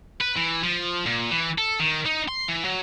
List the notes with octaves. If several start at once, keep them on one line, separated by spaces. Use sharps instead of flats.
B4
E3
F3
A#2
E3
A4
D#3
D#4
C6
E3
F#3